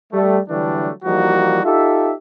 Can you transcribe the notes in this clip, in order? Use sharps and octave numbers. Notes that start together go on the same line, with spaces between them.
G3 A3
D3 E3 F#3 G3 A3 D4
E3 F3 G3 A#3 D#4 F#4
D#4 F4 G4 A4 E5